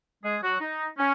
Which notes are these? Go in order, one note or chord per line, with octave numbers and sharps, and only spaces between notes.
G#3 G#4
F#3 F#4
D#4
C#4